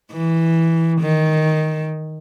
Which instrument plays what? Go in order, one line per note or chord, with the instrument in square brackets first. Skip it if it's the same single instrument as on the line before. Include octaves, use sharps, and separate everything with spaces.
[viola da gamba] E3
D#3